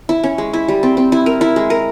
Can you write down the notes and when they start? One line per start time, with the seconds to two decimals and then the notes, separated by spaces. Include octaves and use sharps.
0.09 E4
0.23 C#4
0.38 G#3
0.53 E4
0.68 G3
0.83 C4
0.97 C4
1.12 E4
1.26 A#4
1.41 E4
1.56 G#3
1.70 A#4